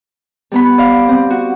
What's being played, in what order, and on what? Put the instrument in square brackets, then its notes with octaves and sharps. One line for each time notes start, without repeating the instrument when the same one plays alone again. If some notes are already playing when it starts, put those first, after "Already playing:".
[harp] G3 B3 B5
D5 F5
C4
F#4